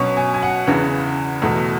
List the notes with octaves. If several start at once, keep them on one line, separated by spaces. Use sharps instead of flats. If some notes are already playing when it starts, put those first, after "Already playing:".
Already playing: B2 F#3 C#4 C#6
G#5
G#5
F#5
E2 C#3 E3
E2 B2 A3